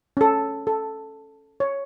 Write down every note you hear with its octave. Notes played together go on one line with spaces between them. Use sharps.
C#4 A4
A4
C#5